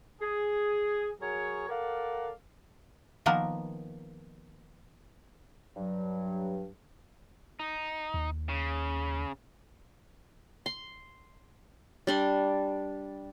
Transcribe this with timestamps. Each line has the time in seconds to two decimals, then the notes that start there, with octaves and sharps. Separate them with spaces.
0.22 G#4
1.21 F#3 G#4 A#4 C#5
1.69 A4 A#4 D5 F5 F#5
3.26 D#3 F3 A#3 B3 A#4
5.76 G2 F#3
7.60 D#4
8.14 D#2
8.49 C#3
10.66 C6
12.07 G3 D4 C6